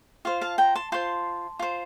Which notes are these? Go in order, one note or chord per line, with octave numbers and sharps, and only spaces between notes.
F4 C5 F5
F5 A5
G5 A#5
A5 C6
F4 C5 A5 C6
F4 C5